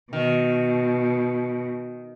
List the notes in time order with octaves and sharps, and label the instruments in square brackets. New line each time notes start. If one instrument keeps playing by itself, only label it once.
[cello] B2 [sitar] D#3